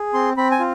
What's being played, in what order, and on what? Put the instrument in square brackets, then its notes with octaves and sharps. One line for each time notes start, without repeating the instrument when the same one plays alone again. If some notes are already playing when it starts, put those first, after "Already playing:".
Already playing: [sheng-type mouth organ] G#4
C4 C6
C4 B5
G#5
F4